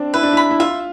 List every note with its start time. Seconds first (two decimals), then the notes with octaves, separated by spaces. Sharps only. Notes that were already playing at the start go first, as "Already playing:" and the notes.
Already playing: C4 D4
0.14 E4 B4
0.23 D4
0.33 E4 B5
0.50 E4
0.60 F4 E5